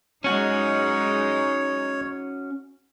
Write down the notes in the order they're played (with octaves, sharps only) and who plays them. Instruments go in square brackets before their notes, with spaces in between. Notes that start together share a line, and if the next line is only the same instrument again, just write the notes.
[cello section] G#3 D#4 [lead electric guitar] C#4 F#4 [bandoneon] C#5